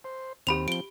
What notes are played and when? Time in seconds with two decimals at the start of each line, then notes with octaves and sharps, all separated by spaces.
0.04 C5
0.47 D#2 C4 G4 B5 F7
0.68 F3 C4 D7 G7